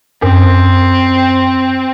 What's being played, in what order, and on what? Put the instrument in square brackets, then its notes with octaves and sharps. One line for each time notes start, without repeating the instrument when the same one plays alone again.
[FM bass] F#2 [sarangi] C4